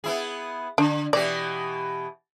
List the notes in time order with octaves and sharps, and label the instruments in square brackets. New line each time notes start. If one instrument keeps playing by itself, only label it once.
[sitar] B3 E4 G#4
[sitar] D3 [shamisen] D4
[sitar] B2 E3 G4 [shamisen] D5